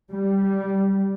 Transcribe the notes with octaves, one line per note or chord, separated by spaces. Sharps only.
G3